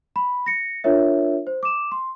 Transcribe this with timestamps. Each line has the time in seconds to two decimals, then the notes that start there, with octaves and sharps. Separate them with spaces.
0.16 B5
0.46 A#6 C#7
0.84 D4 F4 A#4 C#5 E5
1.47 C5
1.63 D6 E7
1.92 C6